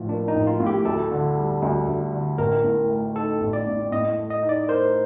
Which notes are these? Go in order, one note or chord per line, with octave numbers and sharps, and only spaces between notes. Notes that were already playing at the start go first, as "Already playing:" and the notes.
Already playing: A1 A2 F3
A#3 D4
D#4
A1
F4
A2
G4
D2 A4
D3
G3
D2
D2
D3
A1 A#4
A2
A3
D#4 A4
A1
D5
A2
A2 D#5
A3
D#5
D#4
D5
A#4 C5